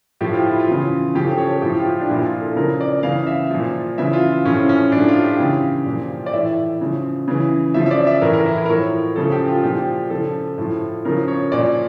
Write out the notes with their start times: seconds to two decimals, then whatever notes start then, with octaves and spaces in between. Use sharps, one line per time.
0.21 A2 F3 G4
0.33 F4
0.47 E4
0.60 F4
0.68 C#3 E3
1.15 C#3 F3 G4
1.26 A4
1.38 C#5
1.50 A4
1.62 A2 F3 G4
1.79 F4
1.85 G4
2.01 D4
2.09 A#2 F3 E4
2.25 F4
2.41 A4
2.56 C#3 F3 A#4
2.81 D5
3.03 C#3 E3 F5
3.27 E5
3.51 A#2 F3
3.98 C#3 E3 E5
4.13 F4
4.45 A2 F3 C#4
4.69 C#4
4.91 A2 F3 D4
5.08 F4
5.24 G4
5.40 C#3 E3
5.86 A#2 F3
6.26 D5
6.33 A2 E3 E5
6.81 C#3 F3
7.28 C#3 E3
7.74 C#3 F3 E5
7.86 E5
7.91 D5
8.07 E5
8.22 A2 E3 A#4
8.33 A#4
8.46 E4
8.58 E4
8.65 A#4
8.69 A2 F3 C#5
9.16 C#3 F3 A4
9.32 G4
9.48 F4
9.63 A#2 F3 G4
10.10 C#3 F3 A4
10.58 A2 F3
11.05 C#3 F3 A#4
11.28 C#5
11.52 A#2 F3 D5